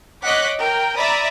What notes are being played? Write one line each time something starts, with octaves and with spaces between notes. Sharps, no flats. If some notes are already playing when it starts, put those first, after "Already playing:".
C#5 D#5 F#5 D6 F#6 B6
A#4 G5
D5 E5 A#5 B5 D#6